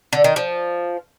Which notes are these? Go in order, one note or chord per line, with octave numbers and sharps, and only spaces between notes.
D3
D#3
F3